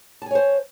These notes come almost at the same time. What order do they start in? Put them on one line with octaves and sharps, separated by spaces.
A5 G#5 C#5 C5